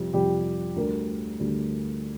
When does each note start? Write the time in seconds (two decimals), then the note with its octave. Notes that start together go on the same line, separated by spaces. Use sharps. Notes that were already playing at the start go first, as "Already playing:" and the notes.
Already playing: F2 C3 G3
0.13 F2 C3 G3 G4
0.76 D2 D3 G3 A#4
1.40 D2 D3 G3